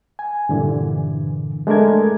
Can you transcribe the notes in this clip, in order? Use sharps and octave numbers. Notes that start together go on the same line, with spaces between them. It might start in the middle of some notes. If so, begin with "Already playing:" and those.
G#5
G2 A#2 D3 E3
G#3 A3 D4 A#4 G#6